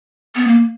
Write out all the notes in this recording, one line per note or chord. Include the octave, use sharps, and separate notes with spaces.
B3
A#3